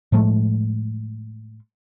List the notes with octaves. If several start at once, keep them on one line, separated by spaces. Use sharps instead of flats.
A2 F3 G#3 A3